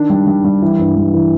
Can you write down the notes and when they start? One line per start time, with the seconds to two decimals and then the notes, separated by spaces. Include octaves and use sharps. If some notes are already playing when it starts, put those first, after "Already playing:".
Already playing: D#3 D4
0.10 G3
0.27 G3
0.44 G3
0.62 E3
0.79 G2
0.97 G3
1.14 E3